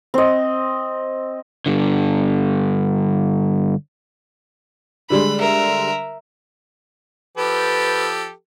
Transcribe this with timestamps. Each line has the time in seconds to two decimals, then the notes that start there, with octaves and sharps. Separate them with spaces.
0.14 C4 D#5
1.66 G2 D3
5.10 D3 G3 G#3 B5
5.39 A#4 E5
7.37 F3 G4 A4 B4